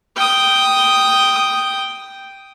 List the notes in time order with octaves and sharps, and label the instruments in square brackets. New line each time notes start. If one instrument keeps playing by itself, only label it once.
[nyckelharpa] G5 D#6